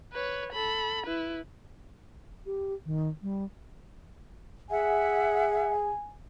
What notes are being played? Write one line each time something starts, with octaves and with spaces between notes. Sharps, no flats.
B4 C#5
A4 B5
E4 B4
G4
D#3
G3
G#4 E5 F#5 G#5